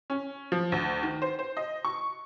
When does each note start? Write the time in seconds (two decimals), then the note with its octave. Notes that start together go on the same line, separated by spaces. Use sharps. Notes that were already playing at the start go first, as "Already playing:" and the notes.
0.10 C#4
0.52 F3
0.72 D2
1.03 D#3
1.22 C5
1.39 C5
1.57 D#5
1.85 C#6